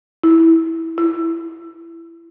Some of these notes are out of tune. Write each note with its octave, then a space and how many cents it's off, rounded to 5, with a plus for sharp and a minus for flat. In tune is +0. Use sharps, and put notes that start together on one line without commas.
E4 -15
E4 +20